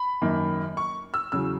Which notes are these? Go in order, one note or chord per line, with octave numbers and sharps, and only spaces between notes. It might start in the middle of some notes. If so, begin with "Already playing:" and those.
Already playing: B5
F#2 D#3 A#3
C#6
E6
E2 C#3 F#3 E6